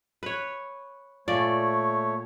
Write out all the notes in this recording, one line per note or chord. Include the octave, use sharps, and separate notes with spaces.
B4 C#5
A#2 A3 C#5 D5